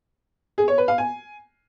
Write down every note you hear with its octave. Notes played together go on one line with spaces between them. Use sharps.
G#4
C#5
B4
F5
G#5